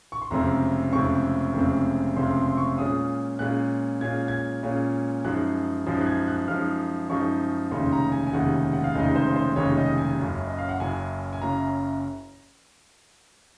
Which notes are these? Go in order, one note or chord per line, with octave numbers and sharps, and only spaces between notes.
C#6
C6
F1 F2 C#3 G#3 C4 A#5
F1 F2 C#3 G#3 C4 C#6
F1 F2 C#3 G#3 C4
F1 F2 C#3 G#3 C4 C6
C6
C6
C#6
A#2 G#3 C#4 F4 D#6
A#2 G#3 C#4 F4 F#6
A#2 G#3 C#4 F4 G#6
G#6
A#2 G#3 C#4 F4
F#2 F3 G#3 D#4 F#6
F#2 F3 G#3 D#4
F#6
G#6
F#6
F#2 F3 G#3 D#4 F6
F#2 F3 G#3 D#4 C#6
F1 D#2 C#3 G#3 D#4 C6
A#5
G#5
G#5
F1 D#2 C#3 G#3 D#4 F#5
F#5
F5
F1 D#2 C#3 G#3 D#4 D#5
C5
C5
F1 D#2 C#3 G#3 D#4 C#5
D#5
G#5
F#1 F#2 C#3
D#5
F5
F#5
F#1 F#2 C#3 G#5
G#5
F#1 F#2 C#3 A#5